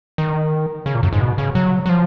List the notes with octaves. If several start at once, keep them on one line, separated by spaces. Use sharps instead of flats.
D#3
C#3
A#2
F#2
G#2
B2
C#3
F#3
F#3
F3